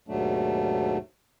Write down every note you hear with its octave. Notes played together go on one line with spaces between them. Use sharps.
D#2 G#2 B2 F#3 A3 D4